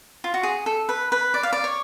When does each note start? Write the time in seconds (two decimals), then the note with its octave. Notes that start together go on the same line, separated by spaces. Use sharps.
0.24 F4
0.34 F#4
0.43 G#4
0.66 A4
0.89 B4
1.12 B4
1.34 D5
1.43 F5
1.53 D5
1.64 C#5